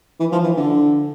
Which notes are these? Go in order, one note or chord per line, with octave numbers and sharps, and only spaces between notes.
E3
F3
E3
D3